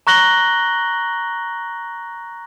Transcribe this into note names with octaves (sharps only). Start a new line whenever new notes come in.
A#5 C#6 F#6 A#6 F#7 G7